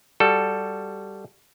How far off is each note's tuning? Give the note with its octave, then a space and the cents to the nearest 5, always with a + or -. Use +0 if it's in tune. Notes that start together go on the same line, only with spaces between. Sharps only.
G3 +0 F#4 +0 A4 +0